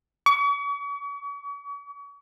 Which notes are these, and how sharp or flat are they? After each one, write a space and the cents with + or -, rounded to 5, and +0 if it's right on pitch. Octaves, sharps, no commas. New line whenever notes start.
C#6 +40